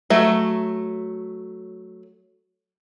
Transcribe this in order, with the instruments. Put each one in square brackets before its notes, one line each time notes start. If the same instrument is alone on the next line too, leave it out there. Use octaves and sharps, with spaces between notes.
[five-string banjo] F#3 A3